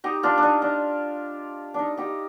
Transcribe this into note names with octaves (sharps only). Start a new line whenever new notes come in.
D#4 G4
D4 F4
D4
D#4
D4
D4 D#4
D#4 G4